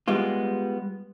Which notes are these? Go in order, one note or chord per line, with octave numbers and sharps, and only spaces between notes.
G3 G#3 B3 F4